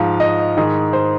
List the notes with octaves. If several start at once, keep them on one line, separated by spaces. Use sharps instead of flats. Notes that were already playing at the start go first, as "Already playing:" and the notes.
Already playing: G#2 F3 F5
D#5
G#2 D#3 G#4
C5